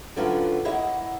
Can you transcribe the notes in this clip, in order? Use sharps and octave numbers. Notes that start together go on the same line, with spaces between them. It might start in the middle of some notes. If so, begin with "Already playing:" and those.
D3 F#3 C#4 F4 B4
A#3 E4 C#5 D#5 F#5